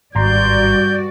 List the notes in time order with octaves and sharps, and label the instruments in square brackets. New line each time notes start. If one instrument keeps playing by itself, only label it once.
[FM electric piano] G#1 A#5 C6 [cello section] G2 F#4 D5 [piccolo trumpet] G6